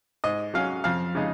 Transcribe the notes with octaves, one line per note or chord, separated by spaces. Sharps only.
G#2 D#5
F#3 C#4 F5
F2 F5
C#3 G#3 D#4